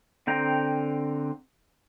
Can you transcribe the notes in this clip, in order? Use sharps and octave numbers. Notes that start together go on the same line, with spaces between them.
D3 C4 G5 A#5